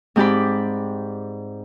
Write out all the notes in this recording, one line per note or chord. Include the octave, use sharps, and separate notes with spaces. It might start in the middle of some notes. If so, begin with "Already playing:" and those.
G#2 C4 G4 D5 B5